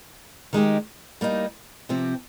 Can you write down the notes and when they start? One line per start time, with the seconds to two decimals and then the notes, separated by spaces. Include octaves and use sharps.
0.53 D#3 G#3 D#4 G4
1.21 G3 A#3 D#4
1.89 C3 F3 C4 G4